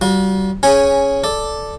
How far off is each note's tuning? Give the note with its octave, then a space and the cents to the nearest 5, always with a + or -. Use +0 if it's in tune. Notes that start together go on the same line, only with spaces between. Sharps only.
G3 -35 F#4 -45
C#4 +0 G#4 -5 G#5 -10
A4 +0 D5 +0